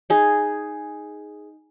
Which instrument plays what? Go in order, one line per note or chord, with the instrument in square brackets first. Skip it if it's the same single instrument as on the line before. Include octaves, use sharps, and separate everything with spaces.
[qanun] D#4 G#4